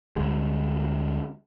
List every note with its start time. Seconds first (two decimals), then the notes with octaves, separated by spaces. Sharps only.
0.16 D2 D3 G3 G#3